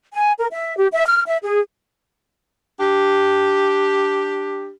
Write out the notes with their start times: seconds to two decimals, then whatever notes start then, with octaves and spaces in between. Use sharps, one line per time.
0.13 G#5
0.39 A#4
0.51 E5
0.78 G4
0.92 E5
1.07 F6
1.26 E5
1.44 G#4
2.80 D4 G4